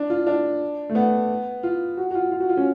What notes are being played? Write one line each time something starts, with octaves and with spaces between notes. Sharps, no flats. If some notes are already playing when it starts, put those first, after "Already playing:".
Already playing: D4
F4
D4
A3
B3
F4
F#4
F#4
F4
F4
F#4
F4
C#4